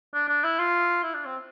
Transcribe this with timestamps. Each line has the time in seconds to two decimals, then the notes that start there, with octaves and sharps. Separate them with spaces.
0.14 D4
0.29 D4
0.44 E4
0.59 F4
1.03 E4
1.14 D4
1.25 C4